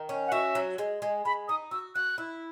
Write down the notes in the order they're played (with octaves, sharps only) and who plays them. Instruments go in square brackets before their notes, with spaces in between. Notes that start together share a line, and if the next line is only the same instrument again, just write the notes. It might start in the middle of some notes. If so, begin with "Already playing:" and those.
Already playing: [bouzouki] D#3
C#4
[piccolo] F#5
[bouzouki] F#4 [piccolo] E5
[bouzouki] F#3
G#3
G#3
[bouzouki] G#3 [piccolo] B5
[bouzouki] D#4 [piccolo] D#6
[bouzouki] F#4 [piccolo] E6
[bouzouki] F#4 [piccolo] F#6
[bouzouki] E4